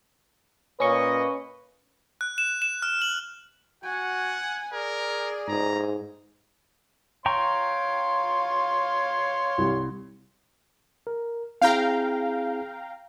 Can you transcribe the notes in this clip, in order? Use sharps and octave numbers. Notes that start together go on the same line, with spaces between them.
A#2 A#3 C#4 B4 D#5 C#6
F#6
E7
E7
F6
F#7
F#4 F#5 G#5
G#4 A#4 D5
G#2 A#5
C#5 F5 G5 A#5 C6 C#6
C2
A#4
C4 E4 G#4 F5 G5 A#5